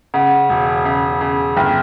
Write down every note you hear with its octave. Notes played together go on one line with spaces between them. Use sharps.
C#3 F#5
E1
C#3
C#3
G1 G5